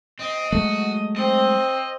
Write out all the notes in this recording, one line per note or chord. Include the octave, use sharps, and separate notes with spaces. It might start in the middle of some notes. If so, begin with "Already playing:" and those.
C4 D#5
F#3 G#3 A3 F#4
C4 D#5